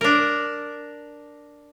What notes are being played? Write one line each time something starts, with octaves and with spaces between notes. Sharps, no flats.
D4 A#4